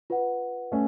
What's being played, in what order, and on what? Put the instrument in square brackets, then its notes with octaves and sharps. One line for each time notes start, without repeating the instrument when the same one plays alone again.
[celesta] F4 B4 F#5
[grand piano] A3 C#4